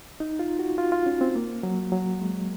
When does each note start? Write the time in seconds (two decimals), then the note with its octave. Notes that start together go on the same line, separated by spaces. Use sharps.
0.20 D#4
0.39 F4
0.59 F#4
0.78 F4
0.92 F4
1.06 C#4
1.21 C4
1.35 A#3
1.63 F#3
1.92 F#3
2.22 G#3